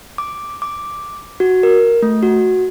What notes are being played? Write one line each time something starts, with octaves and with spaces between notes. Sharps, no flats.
D6
D6
F#4
A#4
A3
F#4